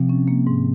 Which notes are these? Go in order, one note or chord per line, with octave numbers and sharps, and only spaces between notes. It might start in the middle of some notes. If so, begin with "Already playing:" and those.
Already playing: C3 F3
C#4
A#3
G#2